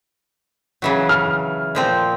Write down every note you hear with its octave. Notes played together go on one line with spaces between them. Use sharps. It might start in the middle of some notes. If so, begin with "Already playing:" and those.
C#3 E3 F#3
F6
A#2 F3 C4